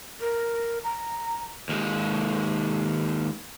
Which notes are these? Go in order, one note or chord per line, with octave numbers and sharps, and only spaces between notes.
A#4
A#5
D#2 G#3